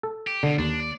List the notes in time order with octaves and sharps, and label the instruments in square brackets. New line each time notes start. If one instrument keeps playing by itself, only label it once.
[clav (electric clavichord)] A4
[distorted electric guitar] G4
[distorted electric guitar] B2 [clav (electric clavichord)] D3
[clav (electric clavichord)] D#2 [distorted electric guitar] D4
[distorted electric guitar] D5